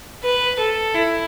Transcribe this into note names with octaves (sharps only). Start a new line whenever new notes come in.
B4
A4
E4